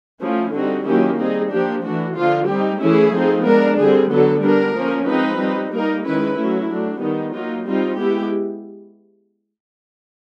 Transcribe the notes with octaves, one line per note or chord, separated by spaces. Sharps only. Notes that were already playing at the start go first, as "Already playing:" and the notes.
F3 A3 C#4 E4 F4
D3 G3 C4 D#4 F#4
D#3 F#3 A#3 C#4 E4 G4
G3 C4 D#4 G#4
F3 A#3 D4 G4
E3 A3 D4 F#4
D3 F3 A#3 F4
G3 C4 D#4 G4
E3 A3 C#4 E4 G#4
F3 A3 C4 D#4
G#3 B3 D4 A#4
D3 G3 C4 G#4
D3 F#3 B3 A4
G3 B3 D4 A#4
F3 A#3 C#4
F3 G#3 C4 D#4 B4
G3 C4 D#4
G3 A#3 D#4 A#4
D#3 G#3 C#4 E4 B4
F#3 A3 C#4 E4
F#3 A3 D4
D#3 G3 B3 D#4
F#3 A#3 D#4 F4
G3 C4 D#4 F4
G#3 B3 E4 G4